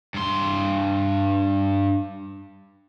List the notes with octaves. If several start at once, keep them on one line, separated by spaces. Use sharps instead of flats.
G2 C6